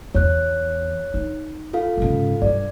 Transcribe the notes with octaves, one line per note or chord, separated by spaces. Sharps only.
E2 C#5 F#6
D#4
F4 A4 F5
G#2 C#3
G2 D5